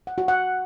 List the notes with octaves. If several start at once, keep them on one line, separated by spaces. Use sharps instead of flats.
F#5
F#4
F#5